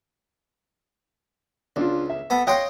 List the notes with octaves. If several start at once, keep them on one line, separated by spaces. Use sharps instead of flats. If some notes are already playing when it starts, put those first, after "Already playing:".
C#2 D4 F4
E5
B3 A4
C#5 D#5 F5 G5 C6